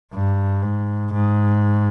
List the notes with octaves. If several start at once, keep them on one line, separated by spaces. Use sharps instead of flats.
G2
G#2
G#2